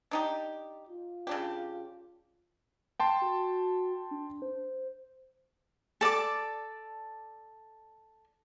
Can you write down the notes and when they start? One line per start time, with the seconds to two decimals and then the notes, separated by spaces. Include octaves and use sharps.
0.11 D4 D#4 G4
0.89 F4
1.27 C#3 D4 G4
3.00 G5 A5 C6
3.22 F#4
4.11 D4
4.42 C5
6.01 A4 D5 A5 D6